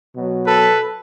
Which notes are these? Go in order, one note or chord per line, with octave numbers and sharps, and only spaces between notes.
B2 F#3
A4 B4